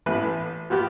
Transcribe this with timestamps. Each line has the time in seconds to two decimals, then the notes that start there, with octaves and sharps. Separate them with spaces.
0.06 A1 A2 E3 B4
0.70 F3 B3 F#4 G4